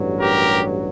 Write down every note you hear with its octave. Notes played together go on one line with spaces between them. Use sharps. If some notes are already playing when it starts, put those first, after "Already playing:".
Already playing: A1 G2 F#3
G4 A#4